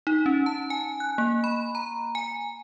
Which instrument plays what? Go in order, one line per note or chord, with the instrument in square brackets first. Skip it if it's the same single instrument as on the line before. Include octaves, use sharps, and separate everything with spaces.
[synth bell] D#4
C#4
A5
G#5
F#6
A#3
B5
A#5
G#5